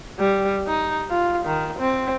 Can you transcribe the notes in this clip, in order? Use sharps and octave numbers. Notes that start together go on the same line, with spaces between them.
G3
D#4
F4
D#3
C4